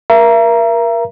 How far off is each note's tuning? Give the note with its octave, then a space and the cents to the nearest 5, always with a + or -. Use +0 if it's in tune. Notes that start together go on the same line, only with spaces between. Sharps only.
A#4 +25 E5 +40 A#5 +10